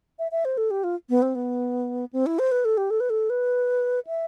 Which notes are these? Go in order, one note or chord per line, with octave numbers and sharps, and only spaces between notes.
E5
E5
C5
A4
G4
F4
B3
C4
B3
C4
E4
C5
B4
A4
G4
A4
B4
A4
B4
E5